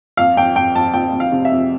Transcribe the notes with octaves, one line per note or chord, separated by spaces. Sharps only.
F2 F5
F2 G5
F2 G5
F2 A5
F2 G5
F2
F5
C3
E5
F2